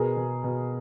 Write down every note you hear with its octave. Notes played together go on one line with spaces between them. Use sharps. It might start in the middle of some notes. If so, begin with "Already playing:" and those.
Already playing: B2 G#4 A#4
B2
B2